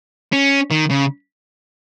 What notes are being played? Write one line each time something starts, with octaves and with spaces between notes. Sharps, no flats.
C#4
D#3
C#3